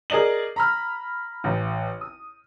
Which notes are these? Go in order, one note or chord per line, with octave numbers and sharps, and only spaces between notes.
G#4 A#4 D5 D#5 F#7
A#5 B5 F6
A1
D#6